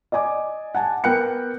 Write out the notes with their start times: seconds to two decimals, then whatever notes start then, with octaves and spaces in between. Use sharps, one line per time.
0.12 D5 D#5 G#5 D6
0.75 F#5 G#5 A5
1.04 B3 A#4 G5 F#6 C#7